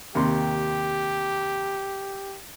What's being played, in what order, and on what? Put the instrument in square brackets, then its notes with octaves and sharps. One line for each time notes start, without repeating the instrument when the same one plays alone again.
[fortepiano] D#2 C3 C6 [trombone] G4